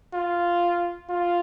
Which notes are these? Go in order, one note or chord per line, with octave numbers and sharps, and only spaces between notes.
F4
F4